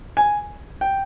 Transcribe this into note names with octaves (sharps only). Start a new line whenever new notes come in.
G#5
G5